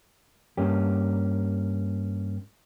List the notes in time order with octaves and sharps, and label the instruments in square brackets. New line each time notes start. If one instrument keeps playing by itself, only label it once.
[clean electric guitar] G2 A#3 C#4 G4